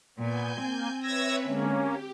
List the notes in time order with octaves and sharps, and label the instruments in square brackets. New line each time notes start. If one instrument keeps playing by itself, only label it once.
[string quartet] A#2 [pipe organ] B3 [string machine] G#5 G6
[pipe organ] A#3 [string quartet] C4
[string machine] B4 C#5 E5 [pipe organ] E6 G#6 A#6
[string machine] D3 G#3 [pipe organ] A#3 C#4
[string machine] G4